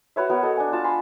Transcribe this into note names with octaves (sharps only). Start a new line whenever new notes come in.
F#4 B4 C#5 E5
B3 F#4 A#4
A4 D#5
D4 G#5
F4 A5
G#5 B5 C6